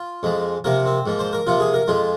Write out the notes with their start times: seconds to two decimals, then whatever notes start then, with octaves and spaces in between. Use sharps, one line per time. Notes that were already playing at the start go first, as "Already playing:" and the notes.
Already playing: F4
0.23 F2 F3 G#3
0.64 C3 F3 A#3 A#4
0.86 C4
1.06 G#2 F3 A#3
1.19 C5
1.33 A#4
1.47 C3 F3 A#3 F4
1.60 G#4
1.74 A#4
1.88 F2 F3 G#3 F4